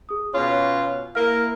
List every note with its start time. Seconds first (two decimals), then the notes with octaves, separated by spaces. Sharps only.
0.09 G#4 D#6
0.34 B2 C#4 F4 C#5
1.15 A#3 E4 A#4 F5 F6